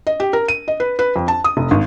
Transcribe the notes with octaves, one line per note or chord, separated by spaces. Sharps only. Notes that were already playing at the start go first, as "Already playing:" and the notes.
D#5
G4
A#4
D#7
D#5
B4
B4
F2
A5
D#6
F1
G#1